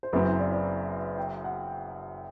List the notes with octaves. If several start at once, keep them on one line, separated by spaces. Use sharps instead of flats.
C5
F#1 F#2 F#3 C4 E4 B4
C5
D5
D5
G5
F#5